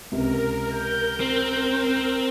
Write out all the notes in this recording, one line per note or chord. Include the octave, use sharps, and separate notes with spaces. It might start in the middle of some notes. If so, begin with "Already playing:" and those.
C#2 C3 A#4
G6
C4